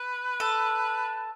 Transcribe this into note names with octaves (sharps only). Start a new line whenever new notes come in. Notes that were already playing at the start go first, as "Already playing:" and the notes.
Already playing: B4
A4